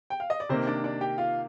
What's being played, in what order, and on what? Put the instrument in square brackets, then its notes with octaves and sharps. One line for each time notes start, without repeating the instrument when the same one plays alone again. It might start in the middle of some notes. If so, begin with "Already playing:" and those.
[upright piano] G5
F5
D#5
D5
[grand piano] C3 D#3 A#3 [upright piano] C4 C5
[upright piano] D4 D5
D4 D5
G4 G5
F4 F5